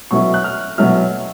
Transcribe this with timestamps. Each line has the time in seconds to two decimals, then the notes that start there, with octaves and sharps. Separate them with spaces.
0.11 B2 F#3 A3 C#4 E4 C#6
0.34 F#6
0.44 F6
0.78 B2 F#3 A3 C#4 E4 F6